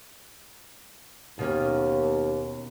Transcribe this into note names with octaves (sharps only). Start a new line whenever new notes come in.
D#2 B2 A#3 C#4